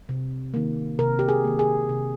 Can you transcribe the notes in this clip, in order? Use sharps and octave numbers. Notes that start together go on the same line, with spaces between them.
C3
D#3 A#3
C3 A#4
G4
G#4
D#3 A#3
G#4
C3